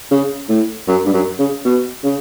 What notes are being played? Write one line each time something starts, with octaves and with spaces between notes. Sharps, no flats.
C#3
A2
F#2
G2
F#2
C#3
B2
C#3